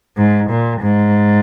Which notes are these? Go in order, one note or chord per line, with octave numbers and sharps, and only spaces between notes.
G#2
A#2
G#2